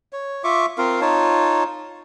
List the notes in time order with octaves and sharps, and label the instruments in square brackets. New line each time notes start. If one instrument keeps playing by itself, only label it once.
[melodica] C#5
F4 E5 C#6 D6
C4 F4 A#4 F5
D#4 F4 C#5 A5